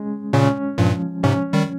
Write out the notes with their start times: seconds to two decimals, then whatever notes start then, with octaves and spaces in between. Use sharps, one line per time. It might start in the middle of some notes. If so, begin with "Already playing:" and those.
Already playing: G#3 C#4
0.33 A#2 C#3 C#4
0.78 G2 A#2 F3
1.23 G#2 C3 C#4
1.53 D#3 G3